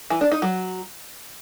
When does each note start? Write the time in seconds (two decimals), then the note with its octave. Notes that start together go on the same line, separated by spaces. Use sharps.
0.10 E3
0.21 D4
0.32 D#4
0.42 F#3